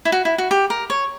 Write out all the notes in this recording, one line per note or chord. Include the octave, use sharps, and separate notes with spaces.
E4
F#4
E4
F#4
G4
A#4
C#5